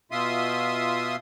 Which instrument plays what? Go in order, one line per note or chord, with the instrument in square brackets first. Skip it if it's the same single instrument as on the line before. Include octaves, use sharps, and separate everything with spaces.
[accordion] B2 F4 E5 C6 D#6